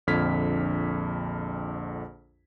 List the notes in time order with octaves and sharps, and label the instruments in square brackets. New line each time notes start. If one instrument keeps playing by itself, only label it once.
[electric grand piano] A#1 F2 D3 F6 G#6 B6